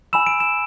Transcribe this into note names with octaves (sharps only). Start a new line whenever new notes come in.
G#5 B5 E6 E7
D7
E7